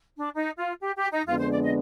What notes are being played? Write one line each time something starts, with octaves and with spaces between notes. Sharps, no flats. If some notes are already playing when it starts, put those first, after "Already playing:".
D4
D#4
F4
G4
G4
D#4
F2 D3 G#3 B3 D4 F4
C5
D5
D#5